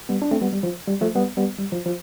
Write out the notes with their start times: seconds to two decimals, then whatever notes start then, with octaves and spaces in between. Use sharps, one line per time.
0.09 G3 B3
0.22 D4
0.31 A3 C4
0.42 G3 B3
0.52 G3
0.63 F3
0.87 G3
1.01 F3 A3
1.15 G3 B3
1.37 G3 B3
1.58 G3
1.72 F3
1.86 F3